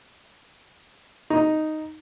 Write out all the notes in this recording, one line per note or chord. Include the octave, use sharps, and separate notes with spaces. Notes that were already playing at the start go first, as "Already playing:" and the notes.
D#4